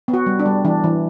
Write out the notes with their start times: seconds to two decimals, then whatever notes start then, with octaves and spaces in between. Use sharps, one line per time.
0.08 B3
0.14 F#4
0.26 G3
0.39 D4
0.46 G3
0.64 E3 D4
0.84 E3